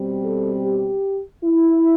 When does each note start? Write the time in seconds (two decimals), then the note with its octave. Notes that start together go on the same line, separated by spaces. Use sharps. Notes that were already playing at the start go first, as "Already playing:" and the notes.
Already playing: B2 G3 C4
0.24 A4
0.63 G4
1.44 E4